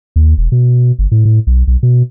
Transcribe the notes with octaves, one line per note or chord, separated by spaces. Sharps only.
D#2
E1
B2
G1
A2
A2
B1
B1
B2